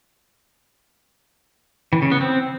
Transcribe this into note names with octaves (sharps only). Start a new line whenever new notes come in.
E3
C#3
B3
C4